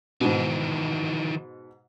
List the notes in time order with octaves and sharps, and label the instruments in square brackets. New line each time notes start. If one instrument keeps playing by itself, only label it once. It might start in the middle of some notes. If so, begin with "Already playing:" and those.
[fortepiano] G#2 B2 [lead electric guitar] D#3 E3